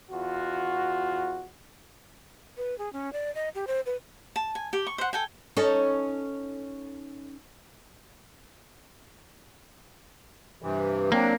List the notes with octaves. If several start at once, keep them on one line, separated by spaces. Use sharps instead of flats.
E2 F4 F#4
B4
G#4
C#4
D5
D#5
G4
C5
B4
A5
G#5
G4
C#6
C5 F#5
A4 G5 G#5
C#4 D#4 A4
G2 C3 E3
F#3 A#3 C4 D4